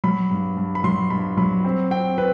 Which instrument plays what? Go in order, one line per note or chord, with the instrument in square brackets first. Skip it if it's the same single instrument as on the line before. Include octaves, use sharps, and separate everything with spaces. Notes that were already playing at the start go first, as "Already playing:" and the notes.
[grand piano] F#3 B5
G2
G2
B5
F#3 C6
G2 B5
F#3 B5
C4
C4 G5
C4 B4